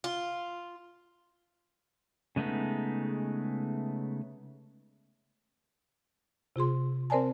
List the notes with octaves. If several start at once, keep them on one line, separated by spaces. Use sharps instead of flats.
F4
C#3 G#3 A3 B3 D#4
C3 F4 G#4 C6
C4 A#4 C5 D5 G#5 A5